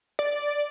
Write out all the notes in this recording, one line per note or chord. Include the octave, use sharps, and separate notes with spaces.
D5